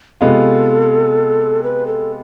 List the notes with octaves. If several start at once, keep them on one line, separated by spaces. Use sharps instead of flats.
C3 G#3 B3 F4 A4
B4
A4